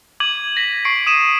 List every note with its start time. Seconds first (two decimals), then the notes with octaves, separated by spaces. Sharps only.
0.20 D6 G#6 D#7 F#7
0.57 A#6 B6
0.85 C#6 C7 D7
1.07 D#6 D#7 E7